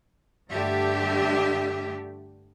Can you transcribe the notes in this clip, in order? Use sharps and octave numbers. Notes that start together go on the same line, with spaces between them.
G2 D3 A3 D4 G4 E5